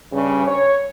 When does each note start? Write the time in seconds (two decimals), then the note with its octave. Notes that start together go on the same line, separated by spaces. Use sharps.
0.13 G2 C#3
0.46 C#5